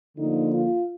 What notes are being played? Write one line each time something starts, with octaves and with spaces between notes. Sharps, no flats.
D3 F3 A#3 D#4
F4